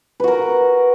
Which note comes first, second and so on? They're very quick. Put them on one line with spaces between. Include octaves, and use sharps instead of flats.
B4 F#4 A#4